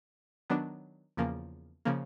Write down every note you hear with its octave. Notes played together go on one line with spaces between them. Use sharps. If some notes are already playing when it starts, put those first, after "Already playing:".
D#3 F#3 B3 D4
E2 C#3 F3 A#3
C#3 F3 A#3